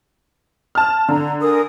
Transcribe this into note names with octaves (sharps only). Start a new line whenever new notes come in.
A5 F6
D3 A#5
A#4 G#5 D#6